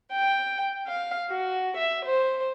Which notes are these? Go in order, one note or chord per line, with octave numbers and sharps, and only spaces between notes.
G5
F5
F#4
E5
C5